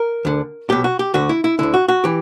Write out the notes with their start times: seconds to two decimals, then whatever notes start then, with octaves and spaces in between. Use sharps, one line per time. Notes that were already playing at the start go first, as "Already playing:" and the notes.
Already playing: A#4
0.25 D2 D3
0.70 B1 B2 G4
0.84 F#4
0.99 G4
1.14 D2 D3 F#4
1.29 E4
1.44 E4
1.59 D2 D3 E4
1.74 F#4
1.88 F#4
2.04 E3 G4